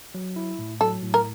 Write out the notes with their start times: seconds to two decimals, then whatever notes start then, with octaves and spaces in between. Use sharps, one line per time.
0.15 F#3
0.36 E4
0.59 A2
0.81 F#3 A4
1.03 A2
1.14 A#4